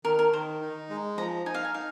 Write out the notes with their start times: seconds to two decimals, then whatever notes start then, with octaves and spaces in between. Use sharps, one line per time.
0.05 D#3 A#4
0.19 A#4
0.33 D#3 C5
0.61 D#4
0.90 G#3
1.17 F3 A#5
1.46 D#4 G#5
1.54 F5
1.64 G#5
1.74 D#4 F5